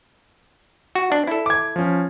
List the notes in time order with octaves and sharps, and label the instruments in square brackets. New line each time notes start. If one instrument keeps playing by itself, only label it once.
[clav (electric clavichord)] F#4
D4
E4 A4
[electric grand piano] D6 G#6
F3 C#4